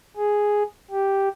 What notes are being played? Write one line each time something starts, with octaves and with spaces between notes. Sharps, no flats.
G#4
G4